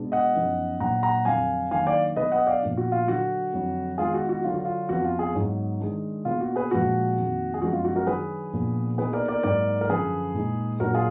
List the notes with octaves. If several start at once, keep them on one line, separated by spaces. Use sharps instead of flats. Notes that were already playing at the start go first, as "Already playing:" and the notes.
Already playing: B2 G#3 D4
D#5 F#5
F#2 F3 B3 D#4
A#2 F#3 D4 F#5 A#5
F#5 A#5
F2 D3 F#3 F5 G#5
D#3 F#3 A#3 D4 F5 G#5
D5 F5
B2 F#3 D4 B4 D#5
D#5 F#5
D5 F5
A#2 F3 B3 D4
F#4
F4
D3 F#3 D4 F#4
F2 D3 F#3
D#3 G#3 B3 D#4 F4 G#4
F#4
F#4
D3 F#3 D4 F4
F#4
F4
F2 F3 B3 F#4
F4
F4 G#4
G#2 F#3 B3 D#4
D#3 G#3 D4
B2 A#3 D4 F4
F#4
G#4 B4
A#2 F3 G#3 D4 F#4
F2 D#3 A#3
G#4
F#2 F3 G#3 B3 D#4 F#4
F4
F#4
F#4 A#4
D#3 F#3 D4 G#4 B4
A#2 F3 B3 D4
B2 A#3 D#4 G#4 B4
A#4 D5
A#4 D5
G#2 F#3 A#3 D#4 A#4 D5
A#4
F#2 D3 F3 G#4 B4
A#2 G#3 D#4
A#2 F#3 D4 F#4 A#4
F4 G#4